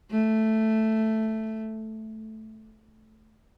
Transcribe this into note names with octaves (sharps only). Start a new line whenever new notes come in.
A3